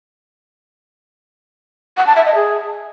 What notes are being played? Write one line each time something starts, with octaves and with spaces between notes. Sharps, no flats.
F#5
A5
E5
D#5
G#4